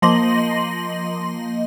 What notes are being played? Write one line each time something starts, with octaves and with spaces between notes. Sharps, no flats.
F3 A#3 D#5 C6 A#6 F#7